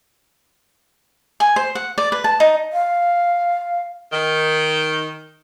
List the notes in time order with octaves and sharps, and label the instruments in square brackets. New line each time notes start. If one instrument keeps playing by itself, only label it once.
[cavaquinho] G#5
C5
F#5
D5
B4
A5
D#4
[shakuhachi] F5
[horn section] D#3